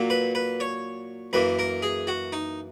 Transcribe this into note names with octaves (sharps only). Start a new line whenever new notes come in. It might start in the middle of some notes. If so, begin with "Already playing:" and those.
Already playing: A#2 F#3 A#3
B4
B4
C#5
F#2 E3 A#3 B4
A#4
G#4
F#4
D#4